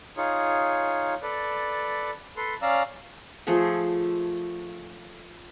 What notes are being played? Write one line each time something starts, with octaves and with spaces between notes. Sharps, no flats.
D#4 F4 G#4 C#5
A4 B4 D5
A4 B4 C6
C#4 D5 F5 A#5 E6
F3 A3 G#4 A4